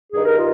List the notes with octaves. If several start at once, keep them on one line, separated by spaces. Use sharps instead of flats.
G2 D#3 G#4
A#4
F4